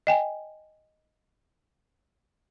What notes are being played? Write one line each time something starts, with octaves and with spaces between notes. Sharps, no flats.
D#5 G5 G#5